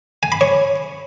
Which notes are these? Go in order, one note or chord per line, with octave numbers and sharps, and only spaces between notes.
G#5
B5
C#5